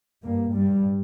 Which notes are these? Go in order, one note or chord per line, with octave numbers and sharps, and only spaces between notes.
G2 A#3
G2 G3